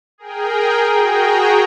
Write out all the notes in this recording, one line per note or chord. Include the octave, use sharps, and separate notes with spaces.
G#4 A#4 G5
F#4 G#4 G5 A#5